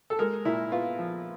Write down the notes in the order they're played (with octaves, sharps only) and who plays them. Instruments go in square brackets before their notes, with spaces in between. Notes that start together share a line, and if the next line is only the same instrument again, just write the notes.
[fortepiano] A4
G#3 A#4
A#2 E4
B3 F4
F3